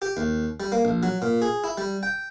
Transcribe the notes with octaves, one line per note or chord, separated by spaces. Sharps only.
G4
D#2
G3
A#3
A#1
F#3
A#2
G#4
E4
G3
G5